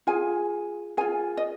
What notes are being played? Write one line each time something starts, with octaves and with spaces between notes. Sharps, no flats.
F4 G#4 G#5
F4 G#4 G#5
D#5